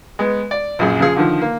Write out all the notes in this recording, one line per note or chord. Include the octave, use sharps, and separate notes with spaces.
G#3 B3
D5
A#1 F#2 G#4
C#3 F3 G#4
D3 D#3 F3
A#3